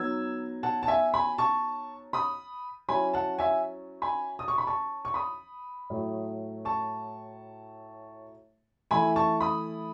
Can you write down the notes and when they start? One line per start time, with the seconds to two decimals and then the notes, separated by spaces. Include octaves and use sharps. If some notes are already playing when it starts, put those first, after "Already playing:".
Already playing: F#3 B3 D#4 E6 G#6
0.63 F#5 A5
0.83 A5
0.88 E5 G#5
1.14 G#5 B5
1.38 A5 C#6
2.13 B5 D#6
2.88 F#3 C#4 E4 G#5 B5
3.14 F#5 A5
3.39 E5 G#5
4.02 G#5 B5
4.39 D#6
4.48 C#6
4.58 B5
4.67 A5 C#6
5.05 C#6
5.14 B5 D#6
5.90 A2 F#3 A3
6.65 A5 C#6
8.91 E3 A3 E4 G#5 B5
9.16 A5 C#6
9.40 B5 D#6